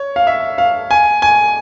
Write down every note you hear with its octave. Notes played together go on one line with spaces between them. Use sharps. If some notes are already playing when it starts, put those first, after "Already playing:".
Already playing: C#5
F5
E5
F5
G#5
G#5